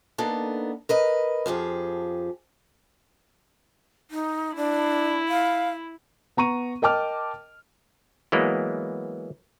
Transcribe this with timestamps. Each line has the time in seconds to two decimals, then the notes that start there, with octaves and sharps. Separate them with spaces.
0.18 A#3 B3 D4 D#4 A4
0.89 A#4 B4 D#5
1.46 F2 F3 G4 G#4
4.11 D#4
4.56 D4 E4
5.29 F5
6.37 B3 A#5 C#6 D#7
6.82 A#4 D#5 G5 A5 D6 F6
8.32 E3 F#3 G#3 A#3 B3